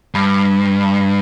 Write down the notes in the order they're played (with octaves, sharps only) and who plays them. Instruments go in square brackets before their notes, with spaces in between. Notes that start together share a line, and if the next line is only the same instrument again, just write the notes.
[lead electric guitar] G2